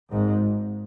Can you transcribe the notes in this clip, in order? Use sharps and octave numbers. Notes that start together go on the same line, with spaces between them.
G#1 G#2